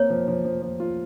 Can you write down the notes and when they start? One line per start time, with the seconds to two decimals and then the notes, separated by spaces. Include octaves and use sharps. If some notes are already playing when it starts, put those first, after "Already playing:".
Already playing: A#3 C4 C#5
0.10 F3
0.28 F3
0.44 F3
0.62 F3
0.80 F4